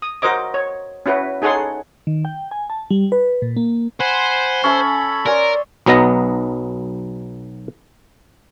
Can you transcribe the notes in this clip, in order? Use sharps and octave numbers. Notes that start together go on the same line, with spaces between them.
D#6
F#4 A#4 C5 D#5 D6
C#5
C#4 E4 F#4 B4
D#4 G#4 A4 C#5 F#5 C6
D#3
G5
G#5
A5
G3
B4
A#2
A#3
C5 F#5 G#5 B5
C#4 A4 E5 B5
A#4 C#5 D5 G#5 C6
B1 F#3 B3 D#5 A#5